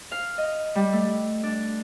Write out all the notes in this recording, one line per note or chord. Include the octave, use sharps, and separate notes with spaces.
F5
D#5
G3
A3
D4